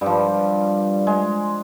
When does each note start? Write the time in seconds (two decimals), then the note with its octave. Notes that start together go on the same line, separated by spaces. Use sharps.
0.01 G2 F3 G3
1.07 G#3